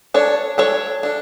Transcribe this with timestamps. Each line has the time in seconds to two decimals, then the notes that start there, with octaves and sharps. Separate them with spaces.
0.14 D4 A4 C#5
0.58 D4 A4 C#5
1.03 D4 A4